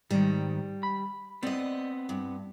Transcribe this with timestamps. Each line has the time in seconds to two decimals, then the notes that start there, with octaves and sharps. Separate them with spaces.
0.11 G#2 D#3 G3
0.83 B5
1.43 B3 C4 D5 D#5
2.09 G2